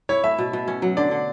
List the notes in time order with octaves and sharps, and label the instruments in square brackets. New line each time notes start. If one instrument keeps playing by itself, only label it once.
[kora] E4 [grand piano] C#5
[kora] A3 [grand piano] E5
[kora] B2
B2
C#4
F#3
[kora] D3 [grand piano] D5
[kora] D3